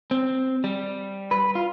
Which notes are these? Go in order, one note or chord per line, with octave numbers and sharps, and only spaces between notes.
C4
G3
B4
F4